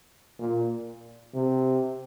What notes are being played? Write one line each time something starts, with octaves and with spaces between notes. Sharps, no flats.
A#2
C3